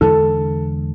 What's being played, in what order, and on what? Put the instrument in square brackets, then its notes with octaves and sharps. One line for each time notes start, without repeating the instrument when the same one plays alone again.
[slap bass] E2 D3 G#3 D4 [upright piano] A4